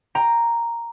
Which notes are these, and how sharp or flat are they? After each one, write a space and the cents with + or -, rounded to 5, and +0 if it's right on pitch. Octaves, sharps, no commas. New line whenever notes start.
G5 +10 A#5 +0